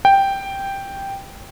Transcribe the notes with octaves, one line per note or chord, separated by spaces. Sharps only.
G5